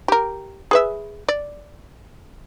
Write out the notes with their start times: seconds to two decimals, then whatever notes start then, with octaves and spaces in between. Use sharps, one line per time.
0.08 G4 A#4
0.71 G#4 B4 E5
1.29 D5